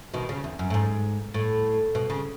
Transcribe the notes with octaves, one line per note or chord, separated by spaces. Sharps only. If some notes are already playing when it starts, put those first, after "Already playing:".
B2 D#3
C#3
E2
F#2
A2
G#2
A2
B2
C#3